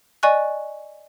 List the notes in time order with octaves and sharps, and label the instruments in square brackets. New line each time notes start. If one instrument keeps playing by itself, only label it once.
[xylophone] D5 D#5 G#5 C#6 F#6